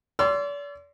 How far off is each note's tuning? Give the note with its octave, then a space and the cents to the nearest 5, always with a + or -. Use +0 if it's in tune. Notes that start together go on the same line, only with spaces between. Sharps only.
D5 -40 C6 +0 E6 +35